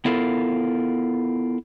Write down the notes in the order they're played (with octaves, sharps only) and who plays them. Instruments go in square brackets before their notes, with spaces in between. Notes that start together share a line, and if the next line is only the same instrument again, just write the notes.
[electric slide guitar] B3 E4 F4 A4 A#4